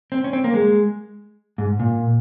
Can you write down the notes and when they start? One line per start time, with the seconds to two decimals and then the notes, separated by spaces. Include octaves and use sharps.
0.12 C4
0.24 C#4
0.33 C4
0.44 A#3
0.54 G#3
1.58 G#2
1.80 A#2